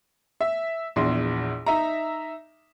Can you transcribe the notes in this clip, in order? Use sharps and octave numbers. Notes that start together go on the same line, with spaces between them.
E5
A#1 E2 C6
D#4 E5 A#5